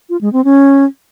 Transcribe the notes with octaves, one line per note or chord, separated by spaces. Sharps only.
F4
G#3
C4
C#4